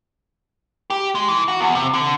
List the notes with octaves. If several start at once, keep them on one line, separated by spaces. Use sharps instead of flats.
G4
G#3
E3
F#4
E2
C3
D3